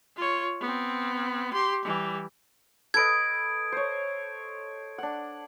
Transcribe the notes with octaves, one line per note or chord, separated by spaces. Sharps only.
F4 C#5
B3 C4
G4 C6
E3 G3
A4 B4 D#5 G#6 D7
C5 C#5
D4 F#5